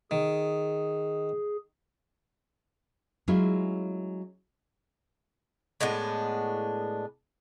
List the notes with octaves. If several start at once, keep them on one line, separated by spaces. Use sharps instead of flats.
D#3 G#4
F#3 G#3 A3 C#4 E4 F4
A2 G#3 B3 D4